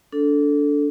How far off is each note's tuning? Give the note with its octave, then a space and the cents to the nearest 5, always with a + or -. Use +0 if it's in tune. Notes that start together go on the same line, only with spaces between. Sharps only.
D4 -20 A4 +0